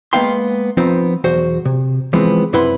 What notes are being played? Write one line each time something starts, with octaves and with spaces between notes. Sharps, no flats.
G#3 A#3 B3 F5 G5 C6
F3 B3 C4 D#4 F4
B1 E2 F#4 C5
C3
E3 F3 G#3 B3 C4
F#2 C3 E4 B4 F#5 C6